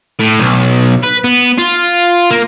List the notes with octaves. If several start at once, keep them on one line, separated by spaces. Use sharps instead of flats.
A2
B1
B4
B3
F4
A#3